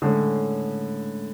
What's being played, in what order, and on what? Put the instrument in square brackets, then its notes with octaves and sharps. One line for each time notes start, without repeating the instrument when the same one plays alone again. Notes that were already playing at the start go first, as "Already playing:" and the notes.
[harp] A2 G#3 C#4 [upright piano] D3